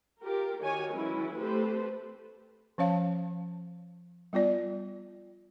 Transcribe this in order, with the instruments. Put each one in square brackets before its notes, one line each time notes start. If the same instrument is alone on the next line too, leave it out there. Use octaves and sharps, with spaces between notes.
[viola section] F4 G4 A#4
D#3 F#4 G4 C#5 G#5
E3 F#3 G#3 C#4 E4
A3 C4 G4 A4 B4 C5
[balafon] F3 C#4 C#5 F5 A5
G3 B3 F4 D5